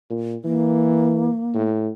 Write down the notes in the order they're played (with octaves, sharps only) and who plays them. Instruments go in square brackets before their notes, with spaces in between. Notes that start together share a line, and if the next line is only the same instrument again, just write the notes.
[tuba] A#2
[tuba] E3 [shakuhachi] A#3
[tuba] A2